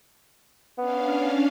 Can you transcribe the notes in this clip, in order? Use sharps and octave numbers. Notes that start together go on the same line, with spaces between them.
B3 C#4 D4 F5